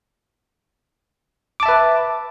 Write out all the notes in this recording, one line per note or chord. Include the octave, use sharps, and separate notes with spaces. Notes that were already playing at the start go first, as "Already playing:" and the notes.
B4 E5 A5 D6